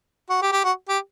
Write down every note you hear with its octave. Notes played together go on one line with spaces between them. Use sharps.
F#4
G4
G4
F#4
G4